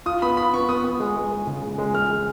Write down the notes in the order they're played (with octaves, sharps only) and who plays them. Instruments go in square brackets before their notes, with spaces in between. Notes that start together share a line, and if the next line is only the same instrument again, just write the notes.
[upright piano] F4 [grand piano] D#6
[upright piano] B3 [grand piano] B5
[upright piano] F4 [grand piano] B5
[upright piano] B3 [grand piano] C#6
[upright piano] B3 [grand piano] D#6
[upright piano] B3
G#3
G#3
G#3
C#3
G#3
G#3
[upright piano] G#3 [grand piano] F6
[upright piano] G#3